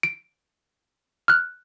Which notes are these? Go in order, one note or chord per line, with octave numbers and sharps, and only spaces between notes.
D7
F6 F#6